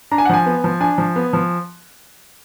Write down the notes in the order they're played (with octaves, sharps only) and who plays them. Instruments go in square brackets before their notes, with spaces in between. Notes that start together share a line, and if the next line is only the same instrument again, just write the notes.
[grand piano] D4 A#5
G#5
F#5
F3 G#5
B3
F3
D4 G#5
F3
B3
F3